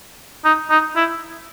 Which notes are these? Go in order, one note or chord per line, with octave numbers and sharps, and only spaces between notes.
D#4
D#4
E4